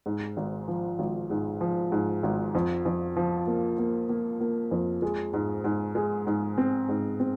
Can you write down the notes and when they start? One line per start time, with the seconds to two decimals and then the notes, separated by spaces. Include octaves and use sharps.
0.06 G#2
0.37 G#1
0.68 F3
0.99 G#1
1.30 G#2
1.61 F3
1.92 G#2
2.23 G#1
2.55 F2
2.85 F2
3.17 F3
3.47 A#3
3.78 A#3
4.09 A#3
4.41 A#3
4.71 F2
5.02 G#3
5.33 G#2
5.64 G#2
5.95 G#3
6.27 G#2
6.58 C4
6.89 G#2
7.20 C4